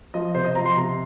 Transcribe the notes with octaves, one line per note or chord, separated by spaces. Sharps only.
F3 D#5
C3 C5
D#5
F3 A#5
C6
C3 A#5